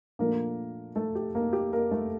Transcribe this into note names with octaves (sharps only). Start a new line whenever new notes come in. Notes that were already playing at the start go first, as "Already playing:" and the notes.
A#2 F3 A3 A#3 D4 A#4
A3 A4
G4
A#3 A#4
G4
A#3 A#4
A3 A4